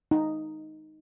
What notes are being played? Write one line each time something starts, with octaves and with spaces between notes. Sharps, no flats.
D#4